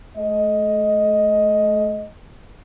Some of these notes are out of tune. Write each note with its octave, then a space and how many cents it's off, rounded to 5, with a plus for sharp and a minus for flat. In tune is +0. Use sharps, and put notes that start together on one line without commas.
A3 -35 D#5 +5